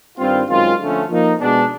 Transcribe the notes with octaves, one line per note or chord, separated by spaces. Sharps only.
G2 D#3 G3 C4 F4
F#2 D#3 G#3 C4 F4
D3 F3 A3 C#4
F3 A#3 D#4
B2 G#3 B3 D4